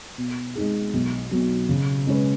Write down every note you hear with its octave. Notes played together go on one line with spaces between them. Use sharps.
B2
G#3 D#4 G#4
B1
B2 F#3
C#3
G#3 C#4 B4